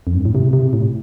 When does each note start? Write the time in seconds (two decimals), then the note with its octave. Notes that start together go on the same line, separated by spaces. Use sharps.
0.07 F2
0.16 G2
0.25 A2
0.35 C3
0.53 C3
0.73 A2